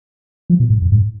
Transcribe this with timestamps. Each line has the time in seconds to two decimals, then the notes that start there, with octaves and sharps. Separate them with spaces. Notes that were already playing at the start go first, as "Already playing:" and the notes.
0.50 F3
0.60 B2
0.70 G#2
0.82 F#2
0.92 G#2